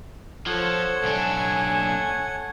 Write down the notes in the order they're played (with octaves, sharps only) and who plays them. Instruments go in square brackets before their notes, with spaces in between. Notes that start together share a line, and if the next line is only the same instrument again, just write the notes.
[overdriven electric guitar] F3 [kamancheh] A4 C5 [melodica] C#5 F#5
[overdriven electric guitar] B1 D4 [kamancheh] A4 G#5